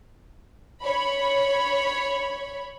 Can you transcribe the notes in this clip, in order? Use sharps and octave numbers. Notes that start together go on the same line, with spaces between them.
C#5 B5